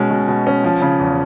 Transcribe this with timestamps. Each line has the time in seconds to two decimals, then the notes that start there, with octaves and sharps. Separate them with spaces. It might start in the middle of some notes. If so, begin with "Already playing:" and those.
Already playing: B2 G#3 C#4
0.11 B2
0.28 B2
0.47 C#4
0.64 F3
0.82 C#3
0.99 E2